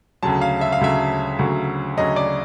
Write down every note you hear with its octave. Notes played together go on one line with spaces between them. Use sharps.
D2 C#3 F#3 A5
F5
E5
F5
D2 C#3 F#3 E5
D2 C#3 F#3
D2 C#3 F#3 D#5
D5